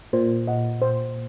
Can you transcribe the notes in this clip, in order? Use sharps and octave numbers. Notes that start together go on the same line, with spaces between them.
A#2 C5
D#5 F#5
C5